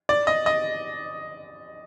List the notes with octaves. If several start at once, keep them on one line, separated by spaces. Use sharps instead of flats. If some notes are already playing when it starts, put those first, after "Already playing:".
D5
D#5
D#5